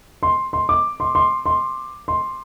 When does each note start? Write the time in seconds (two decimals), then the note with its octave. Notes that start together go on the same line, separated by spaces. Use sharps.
0.23 C6
0.53 C6
0.69 D6
1.00 C6
1.15 C6
1.46 C6
2.08 C6